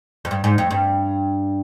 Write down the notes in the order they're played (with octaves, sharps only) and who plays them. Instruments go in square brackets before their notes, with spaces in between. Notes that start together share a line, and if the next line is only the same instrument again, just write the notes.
[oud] F2
G2
G#2
F2
G2